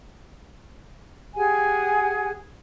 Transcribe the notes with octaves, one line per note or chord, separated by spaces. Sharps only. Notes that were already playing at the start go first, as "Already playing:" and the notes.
G4 G#4 F#5 G#5